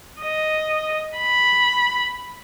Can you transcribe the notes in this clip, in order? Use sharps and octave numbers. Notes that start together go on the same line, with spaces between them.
D#5
B5